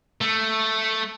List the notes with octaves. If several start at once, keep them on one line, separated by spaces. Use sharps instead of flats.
A3